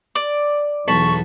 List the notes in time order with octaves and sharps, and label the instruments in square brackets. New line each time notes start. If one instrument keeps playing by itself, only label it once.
[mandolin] D5
[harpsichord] B1 A5 B5 [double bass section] E2 [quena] C#6